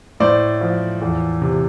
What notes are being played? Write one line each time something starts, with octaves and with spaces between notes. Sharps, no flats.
A2 C5 D5
F3
E2
C3